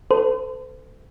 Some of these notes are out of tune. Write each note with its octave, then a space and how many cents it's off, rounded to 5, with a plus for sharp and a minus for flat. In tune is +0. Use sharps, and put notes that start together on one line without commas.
A4 +10 C5 -45